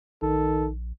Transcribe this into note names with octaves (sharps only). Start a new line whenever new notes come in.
A#1 D#3 A4